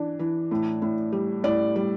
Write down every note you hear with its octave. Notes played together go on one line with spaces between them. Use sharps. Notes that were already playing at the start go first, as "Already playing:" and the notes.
Already playing: E3 D4
E3
A2
A2
G3
A2 D5
G3